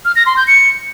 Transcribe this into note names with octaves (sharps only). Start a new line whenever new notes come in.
F6
A#6
C6
G6
C#7